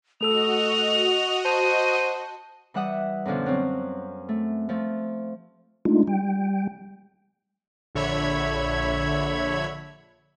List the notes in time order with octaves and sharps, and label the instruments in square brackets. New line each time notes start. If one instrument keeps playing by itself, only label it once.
[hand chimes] A3 A4 E6 [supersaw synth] F#4 D#5 [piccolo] F7
[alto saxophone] C5 [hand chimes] A5 [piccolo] D#7
[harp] E3 G3 E5 F#5 D#6
F#2 B2 D3 F3
F#3 C4
A3
F3 A3
[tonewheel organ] G#3 A3 D4 D#4 F4
G3 G5
[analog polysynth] A#1 D3 C#5 E5 B5 G#6